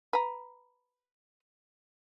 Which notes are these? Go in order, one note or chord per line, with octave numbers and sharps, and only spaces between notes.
B4 A#5